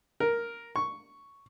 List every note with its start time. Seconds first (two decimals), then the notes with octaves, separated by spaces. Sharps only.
0.20 A#4
0.76 C#6